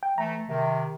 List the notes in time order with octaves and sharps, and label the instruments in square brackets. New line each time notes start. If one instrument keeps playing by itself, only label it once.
[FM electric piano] G5
[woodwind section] E3 A3 [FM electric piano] A#5
[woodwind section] C3 D#3